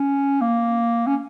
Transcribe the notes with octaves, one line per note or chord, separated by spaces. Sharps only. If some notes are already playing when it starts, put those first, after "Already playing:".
Already playing: C#4
A#3
C#4